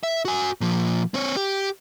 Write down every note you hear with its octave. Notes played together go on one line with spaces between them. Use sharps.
E5
F#4 G#5
A#2 F3
C4 C#5
G4